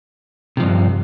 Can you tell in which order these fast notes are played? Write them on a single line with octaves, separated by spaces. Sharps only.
C3 F3 G2